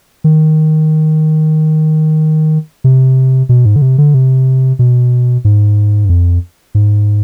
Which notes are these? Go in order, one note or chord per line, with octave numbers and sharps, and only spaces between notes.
D#3
C3
B2
G#2
D3
C3
D3
C3
B2
G#2
G2
F2
G#2